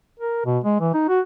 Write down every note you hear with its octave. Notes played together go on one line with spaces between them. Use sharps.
A#4
B2
G#3
E3
D#4
F#4